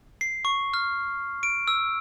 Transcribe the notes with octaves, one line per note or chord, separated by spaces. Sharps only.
C7
C#6
F6
D7
E6